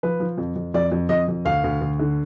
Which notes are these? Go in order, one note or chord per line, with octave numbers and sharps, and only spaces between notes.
F3 B4
F3
F2
F2
F2 D5
F2
F2 D#5
F2
D2 F5
D2
D2
D3